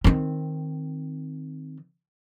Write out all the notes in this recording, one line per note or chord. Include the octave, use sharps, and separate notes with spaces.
D#3 C4